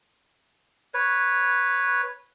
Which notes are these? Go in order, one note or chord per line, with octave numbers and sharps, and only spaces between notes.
B4 C#5